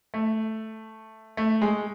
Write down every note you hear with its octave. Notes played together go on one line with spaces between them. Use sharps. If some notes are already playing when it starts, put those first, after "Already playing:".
A3
A3
G#3